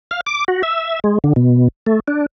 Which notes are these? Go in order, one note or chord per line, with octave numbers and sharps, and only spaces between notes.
F5
D6
F#4
E5
G#3
D3
B2
A3
D4